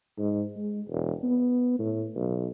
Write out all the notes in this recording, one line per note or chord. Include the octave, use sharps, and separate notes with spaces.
G#2
G#3
E1
B3
A2
B1